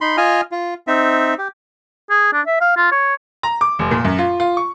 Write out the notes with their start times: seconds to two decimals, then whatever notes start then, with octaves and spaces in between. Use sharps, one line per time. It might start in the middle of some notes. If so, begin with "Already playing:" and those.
0.01 D#4 B5 C6
0.17 F4 D#5 G#5 F6
0.52 F4
0.87 C4 D#4 E5
1.38 G4
2.10 G#4
2.33 D4
2.46 E5
2.61 F5
2.77 F4
2.92 C#5
3.43 A#5
3.61 D6
3.79 F1
3.91 A#2
4.05 F#2
4.19 F4
4.40 F4
4.57 C#6